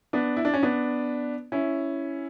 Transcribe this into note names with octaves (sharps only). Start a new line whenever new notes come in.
B3 D4
E4
D4
C#4
B3 D4
C#4 E4